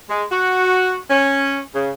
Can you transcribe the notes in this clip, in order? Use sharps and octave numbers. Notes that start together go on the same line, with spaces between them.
G#3
F#4
C#4
C#3